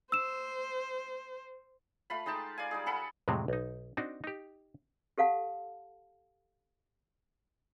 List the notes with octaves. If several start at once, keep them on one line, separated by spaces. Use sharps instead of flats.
C5 E6 E7
A3 F4 B5
G#3 D#4 G5 A5
D5 F5 G#5
G3 D#4 G#4
G#4 A4 F#5 B5
F2 A2 C3 F#3 G#3 C4
B1 D#4
C4 D4 D#4 F#4
D#4 G4
G4 A4 F5 F#5 A5